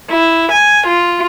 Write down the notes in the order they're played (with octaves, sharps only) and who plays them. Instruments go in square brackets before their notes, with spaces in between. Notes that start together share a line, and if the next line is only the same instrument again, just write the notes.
[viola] E4
G#5
F4